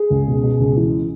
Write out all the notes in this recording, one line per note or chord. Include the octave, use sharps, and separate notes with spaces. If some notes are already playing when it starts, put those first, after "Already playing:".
Already playing: G#4
C#2
B2
B2
C#2
E3